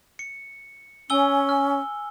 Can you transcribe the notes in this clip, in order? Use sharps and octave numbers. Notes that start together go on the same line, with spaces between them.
C#7
C#4 G#5 E6 G7
F6